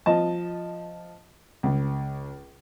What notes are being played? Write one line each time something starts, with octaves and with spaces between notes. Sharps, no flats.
F3 D#5 A5
C#2